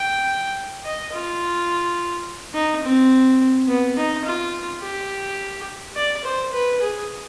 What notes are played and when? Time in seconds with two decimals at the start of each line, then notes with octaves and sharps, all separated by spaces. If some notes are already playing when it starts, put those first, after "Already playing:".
Already playing: G5
0.84 D#5
1.13 F4
2.54 D#4
2.83 C4
3.68 B3
3.97 D#4
4.25 F4
4.82 G4
5.96 D5
6.24 C5
6.53 B4
6.81 G#4